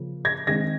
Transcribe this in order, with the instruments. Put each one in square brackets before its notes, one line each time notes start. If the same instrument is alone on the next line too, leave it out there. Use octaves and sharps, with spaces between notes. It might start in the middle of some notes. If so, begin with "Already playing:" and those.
Already playing: [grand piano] C#3 F3 A#3
G#6 A#6
D#3 G#3 C4 D#4 G#6 A#6